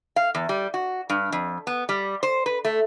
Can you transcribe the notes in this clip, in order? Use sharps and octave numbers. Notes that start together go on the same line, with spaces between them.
F5
E2
G3
F#4
G2
F2
B3
G3
C5
B4
A3